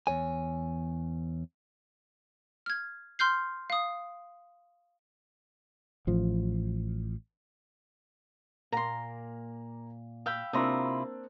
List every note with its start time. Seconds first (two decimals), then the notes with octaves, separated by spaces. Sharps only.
0.07 E2 G2 C#5 G#5
2.66 F6 G#6
3.19 C6 F6 G6 C7
3.70 F5 D#6
6.07 A1 F3
8.72 A#2 A#3 A#4 A#5 C6
10.26 F5 G5 B5 E6
10.53 C3 A#3 C4 D4 E4 F4 A#5 D#6